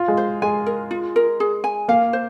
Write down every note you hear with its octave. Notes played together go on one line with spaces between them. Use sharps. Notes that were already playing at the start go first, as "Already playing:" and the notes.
Already playing: F4
G#3
C5
G#3 G#5
A#4
F4
A#4
G#4
G#5
A#3 F5
C5